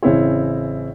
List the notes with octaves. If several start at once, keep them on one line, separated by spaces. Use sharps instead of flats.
A1 C#3 C4 E4 C#5